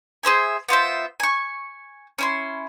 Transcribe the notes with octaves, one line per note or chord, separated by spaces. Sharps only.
G#4 C5 E5 G#5
B3 F4 C5 E5
G#5 C#6
C#4 E4 C6